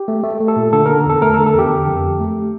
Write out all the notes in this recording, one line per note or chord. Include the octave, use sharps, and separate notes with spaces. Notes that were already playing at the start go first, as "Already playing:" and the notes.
Already playing: G4
A3
A3
A3
A4
A#2
D3 A4
D3 A#4
E2 A4
A3 A#4
A4
D3
A4
E2 G4
D3
F2
F2
A3